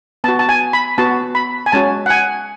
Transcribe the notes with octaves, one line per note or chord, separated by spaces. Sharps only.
B3 F#4 A5
A5
G#5
B5
B3 F#4 A5
B5
G#5
G#3 C#4 F#4 A5
F#5
G#5